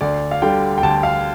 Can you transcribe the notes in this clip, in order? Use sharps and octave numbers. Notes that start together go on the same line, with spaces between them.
D2 D5
F5
D3 G3 G5
G5
D2 A5
F5